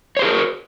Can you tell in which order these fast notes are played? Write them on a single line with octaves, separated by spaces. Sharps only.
C#5 C5 G#4 A#4 F#4